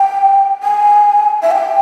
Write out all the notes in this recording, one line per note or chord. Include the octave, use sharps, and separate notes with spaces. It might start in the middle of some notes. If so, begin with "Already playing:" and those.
Already playing: G5
G#5
E5
G5